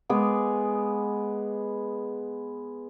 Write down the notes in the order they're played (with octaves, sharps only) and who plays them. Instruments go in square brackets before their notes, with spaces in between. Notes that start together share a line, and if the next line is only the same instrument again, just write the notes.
[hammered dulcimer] G#3 B3 G#4 D6